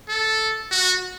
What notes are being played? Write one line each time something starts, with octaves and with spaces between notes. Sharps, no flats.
A4
F#4